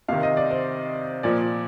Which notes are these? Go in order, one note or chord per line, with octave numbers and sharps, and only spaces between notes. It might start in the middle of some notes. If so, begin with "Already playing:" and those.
C3 D#3 F5
D#5
D5
C5
A#2 F3 D5